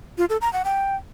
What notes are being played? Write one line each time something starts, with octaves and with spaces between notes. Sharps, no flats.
F4
A4
A#5
F#5
G5